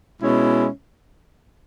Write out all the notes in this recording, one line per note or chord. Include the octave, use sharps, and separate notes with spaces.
B2 G#3 C#4 E4